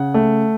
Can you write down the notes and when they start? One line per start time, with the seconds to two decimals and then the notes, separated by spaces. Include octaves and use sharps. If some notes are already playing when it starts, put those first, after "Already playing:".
Already playing: C#3 F#5
0.14 A3